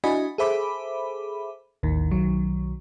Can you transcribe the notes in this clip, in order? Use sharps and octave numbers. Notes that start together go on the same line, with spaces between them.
D4 E4 F#4 D#5 G#5 B5
G#4 A4 C5 E5 B5 D6
A1 D#2 D#3
B1 D#3 F#3